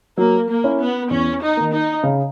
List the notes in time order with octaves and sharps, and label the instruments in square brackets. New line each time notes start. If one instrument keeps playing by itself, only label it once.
[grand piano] F#3 [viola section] A#3
[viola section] A#3
[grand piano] C#4 E4
[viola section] B3
[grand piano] E2 [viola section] C#4
[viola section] D#4
[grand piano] D#3 A#3
[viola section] D#4
[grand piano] C#3